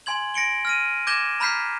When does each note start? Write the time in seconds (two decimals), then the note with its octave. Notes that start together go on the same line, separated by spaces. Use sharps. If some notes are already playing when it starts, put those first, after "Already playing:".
0.06 G#5 C6 G#6 F#7
0.34 A#6 C#7 D7 G7
0.65 F6 A#6 D#7
1.07 D6 G6 G#6 A#6 E7 G7
1.40 A#5 B5 F6 G6 B6 C7